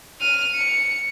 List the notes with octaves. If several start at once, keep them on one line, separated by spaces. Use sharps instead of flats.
F6 D#7
C#7